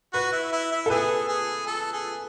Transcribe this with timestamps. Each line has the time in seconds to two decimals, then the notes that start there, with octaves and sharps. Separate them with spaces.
0.13 F#4 B4
0.32 E4
0.53 E4
0.71 E4
0.86 A4
0.90 G#4 B4
1.29 G#4
1.67 A4
1.93 G#4